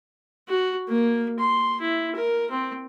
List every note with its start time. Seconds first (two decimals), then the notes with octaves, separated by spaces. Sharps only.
0.48 F#4
0.88 A#3
1.39 C6
1.81 E4
2.15 A#4
2.50 C4